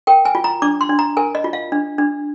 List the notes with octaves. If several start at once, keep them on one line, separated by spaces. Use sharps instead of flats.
A#4 G5
G#5
F4
A#5
D4 D6
C6
D4
A#5
A#4 G#5
D#5
F4
F5
D4
D4